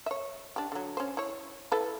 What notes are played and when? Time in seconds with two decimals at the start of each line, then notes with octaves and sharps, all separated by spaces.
0.06 C#5 E5
0.56 D4 G4
0.72 D3 F#3
0.97 C#4 C5
1.17 E4 C#5
1.72 E4 A4 B4